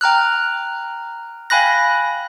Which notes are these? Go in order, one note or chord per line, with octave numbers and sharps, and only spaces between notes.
G5 A#5 F6 F#6
F5 G5 G#5 B5 F#6 A#6